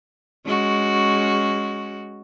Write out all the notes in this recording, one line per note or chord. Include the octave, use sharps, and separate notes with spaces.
G#3 C#4 F#4